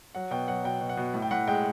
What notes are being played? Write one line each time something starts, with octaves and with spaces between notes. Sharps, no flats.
F#3 F#5
B2 G5
F#3 F#5
B2 G5
B2
F#5
B2
A2
G5
A2 F#5
G#3 G5